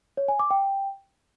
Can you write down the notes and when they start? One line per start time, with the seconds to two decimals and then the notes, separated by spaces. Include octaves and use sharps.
0.17 C#5
0.28 G#5
0.39 D6
0.51 G5